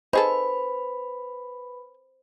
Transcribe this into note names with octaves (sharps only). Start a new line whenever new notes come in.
D#4 G#4 A4 B4 C5 B5